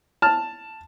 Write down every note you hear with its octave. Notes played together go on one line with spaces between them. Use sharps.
A5 F6